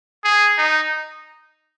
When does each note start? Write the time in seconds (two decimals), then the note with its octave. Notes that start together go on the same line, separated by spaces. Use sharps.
0.24 G#4
0.58 D#4